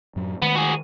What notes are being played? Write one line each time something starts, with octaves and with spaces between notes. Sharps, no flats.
F#2 A2 F#3
D#3 G#3 A3 B3
F#4 G#4